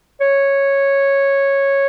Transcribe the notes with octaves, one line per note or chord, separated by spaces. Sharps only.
C#5